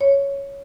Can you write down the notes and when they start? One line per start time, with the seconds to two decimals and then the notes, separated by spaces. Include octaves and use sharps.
0.01 C#5